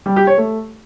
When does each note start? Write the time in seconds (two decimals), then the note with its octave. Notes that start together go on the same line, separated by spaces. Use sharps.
0.06 G3
0.16 G4
0.27 C#5
0.38 A3